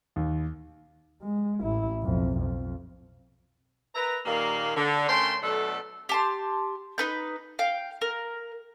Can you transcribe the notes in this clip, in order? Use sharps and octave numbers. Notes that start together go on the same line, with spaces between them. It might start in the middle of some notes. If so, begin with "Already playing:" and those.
D#2
G#3
A1 E4
B1 F2
F2
A#4 B4 E5 A#5
A#2 D#3 G3 A#3
D3
A3 C#4 A#4 G5 C6
B2 F#3 A3 D4 A4
G4 A5 C6
D#4 B4 G6
F5 G5
A#4